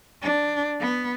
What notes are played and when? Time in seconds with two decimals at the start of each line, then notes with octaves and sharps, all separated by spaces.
0.22 D4
0.80 B3